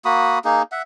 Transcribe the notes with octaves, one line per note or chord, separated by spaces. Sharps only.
A#3 F#4 B5 D#6
A#3 D#4 G#4
E5 F#5